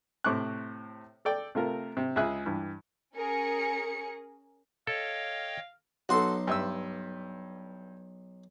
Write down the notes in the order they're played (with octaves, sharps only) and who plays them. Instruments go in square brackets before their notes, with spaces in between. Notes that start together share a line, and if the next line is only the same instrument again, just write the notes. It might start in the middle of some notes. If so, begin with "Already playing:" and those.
[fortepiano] A2 C3 C5 C#6 D6 F#6
A4 D5 G5
C3 A3 F4 A#4
C3
C#2 G#3 G#4 E5 F#6
G2 E3
[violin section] C#4 G#4 A#4 C#7
[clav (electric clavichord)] A4 [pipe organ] C#5 D#5 G5 [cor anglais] F5
[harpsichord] B1 C6 [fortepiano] F#4 A4
[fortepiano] G2 E5 E6